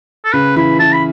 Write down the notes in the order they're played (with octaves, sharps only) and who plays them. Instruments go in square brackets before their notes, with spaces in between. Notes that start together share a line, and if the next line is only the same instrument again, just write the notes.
[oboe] A4
[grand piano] C#3 [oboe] B4
[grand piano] E3 [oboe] B5
[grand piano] E3 [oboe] A5
[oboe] B5